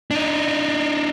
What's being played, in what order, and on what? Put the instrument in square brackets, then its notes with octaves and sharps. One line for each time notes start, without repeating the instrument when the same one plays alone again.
[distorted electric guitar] D4 D#4